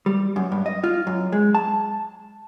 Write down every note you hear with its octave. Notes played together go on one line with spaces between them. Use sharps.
G3
F#2
G2
D#5
F4
F#2
G#3
A5